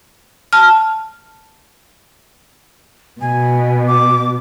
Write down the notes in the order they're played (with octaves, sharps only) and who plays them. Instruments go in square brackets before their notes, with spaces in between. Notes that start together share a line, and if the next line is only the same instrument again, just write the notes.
[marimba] A5 F6
[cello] B2 [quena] G#5
[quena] D6